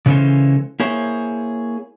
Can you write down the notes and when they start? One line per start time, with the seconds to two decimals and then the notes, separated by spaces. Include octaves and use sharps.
0.06 C#3 E3 G#3 C#4 A4 C5
0.80 A#3 E4 G#4 C5 C#5